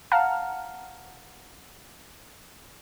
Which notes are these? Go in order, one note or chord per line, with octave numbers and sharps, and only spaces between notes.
F5 F#5 A5 A#5 F6